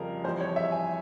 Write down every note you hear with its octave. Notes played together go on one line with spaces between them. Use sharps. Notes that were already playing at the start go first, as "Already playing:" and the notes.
Already playing: F2 C#3 G3 A#4
F2 E3 G3 C5
C#5
E5
G#5